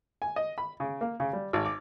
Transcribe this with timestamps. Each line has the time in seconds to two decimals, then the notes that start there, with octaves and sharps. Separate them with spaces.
0.22 G#5
0.36 D#5
0.58 B5
0.80 C#3
1.01 A#3
1.20 C#3
1.33 G3
1.53 G#1
1.65 D6